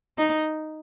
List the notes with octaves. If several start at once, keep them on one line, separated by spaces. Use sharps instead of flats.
D#4